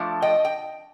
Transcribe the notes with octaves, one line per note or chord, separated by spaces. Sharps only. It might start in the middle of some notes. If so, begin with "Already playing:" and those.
Already playing: F3 A3 D4
D#5 G5
G5